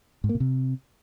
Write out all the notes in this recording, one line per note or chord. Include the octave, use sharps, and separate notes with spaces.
G#2
A#3
B2
C3